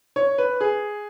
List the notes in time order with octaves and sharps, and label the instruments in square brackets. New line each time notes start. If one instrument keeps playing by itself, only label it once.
[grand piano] C#5
B4
G#4